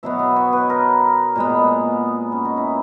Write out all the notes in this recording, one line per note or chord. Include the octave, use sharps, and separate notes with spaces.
B2 F#3 B3 E5
D#5
C#5
B4
A#4
A#2 G#3 B3
C#4
D#4
E4